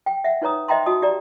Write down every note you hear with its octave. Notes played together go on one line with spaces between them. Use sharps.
G5
E5 F#5
D#4 B4 C#5 A#5 D#6
C5 D#5 E5 G5 A#5 C6
F#4 D#5 A5 D#6
G4 D5 A#5